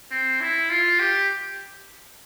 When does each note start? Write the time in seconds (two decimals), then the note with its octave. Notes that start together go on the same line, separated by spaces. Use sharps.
0.11 C4
0.40 E4
0.70 F4
0.99 G4